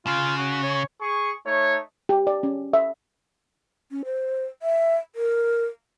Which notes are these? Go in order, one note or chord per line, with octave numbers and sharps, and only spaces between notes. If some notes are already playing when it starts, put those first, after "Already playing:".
C#3 F4
F#4
C#5
G#4 C#6
A3 D#4 C#5
G4
D5
C#4
E5
C#4
C5
E5
A#4